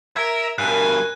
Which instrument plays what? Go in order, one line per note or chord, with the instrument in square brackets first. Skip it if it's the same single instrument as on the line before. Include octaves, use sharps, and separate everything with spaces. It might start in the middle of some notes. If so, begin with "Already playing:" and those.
[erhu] A#4 [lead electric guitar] E5 [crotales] G#6
[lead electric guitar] G2 B2 [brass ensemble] A#4 [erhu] G#5 [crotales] F#6